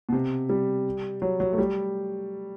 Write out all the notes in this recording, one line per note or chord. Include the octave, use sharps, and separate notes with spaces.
B2
C3
G3
F#3
F#3
A3
G3